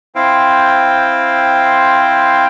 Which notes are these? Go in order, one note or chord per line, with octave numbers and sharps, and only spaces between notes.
C4 E4 C5 F5 G5